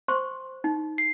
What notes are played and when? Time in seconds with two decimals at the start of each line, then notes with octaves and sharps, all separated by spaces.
0.08 C5 C6 C#6
0.64 D#4
0.98 C7